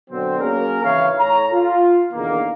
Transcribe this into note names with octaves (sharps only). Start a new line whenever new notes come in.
B2 D3 F#3 B3 C4
F#3 A#3 C#4 G#4 A#4
G#1 C#3 E3 E4 C#5 F5
A2 A4 C#5 A#5
F4
E2 B2 D3 D#3 A#3